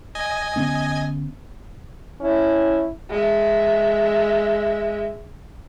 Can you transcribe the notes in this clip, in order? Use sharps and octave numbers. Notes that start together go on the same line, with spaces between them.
D#5 G#5
D3 B3 C#4
C#4 E4
G#3 E5